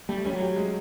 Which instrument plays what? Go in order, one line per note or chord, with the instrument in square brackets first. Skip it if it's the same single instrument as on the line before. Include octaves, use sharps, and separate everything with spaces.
[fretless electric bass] G3 [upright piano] A3
[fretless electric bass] G3 [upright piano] C#4
[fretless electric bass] F#3
[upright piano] G4
G#3